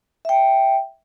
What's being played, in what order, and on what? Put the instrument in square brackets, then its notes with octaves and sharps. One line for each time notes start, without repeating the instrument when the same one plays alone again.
[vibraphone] E5 G5